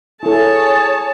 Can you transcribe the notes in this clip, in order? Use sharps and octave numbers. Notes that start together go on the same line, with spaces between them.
E4 G#4 A4 C#5 A5